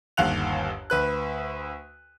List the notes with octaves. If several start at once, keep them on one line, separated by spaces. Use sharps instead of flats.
G1 D#2 F5 F#5 F#6 F7
D2 B4 F#6